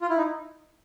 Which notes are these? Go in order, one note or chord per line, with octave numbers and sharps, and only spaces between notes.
F4
E4
D#4